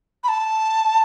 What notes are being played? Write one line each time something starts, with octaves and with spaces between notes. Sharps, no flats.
B5
A5